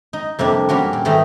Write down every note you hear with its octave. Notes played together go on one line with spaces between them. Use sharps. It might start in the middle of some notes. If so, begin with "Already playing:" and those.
D#4
F2 C3 G3 A#3 D4
G3 A#3 C#4 F#4
A#2
G#2 D#3 E3 G3 A3 D#4